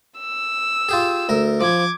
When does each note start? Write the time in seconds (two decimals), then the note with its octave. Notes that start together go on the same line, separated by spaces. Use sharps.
0.19 E6
0.89 F4 G4 G#4
1.29 D2 A#4
1.61 F3 D6 G#6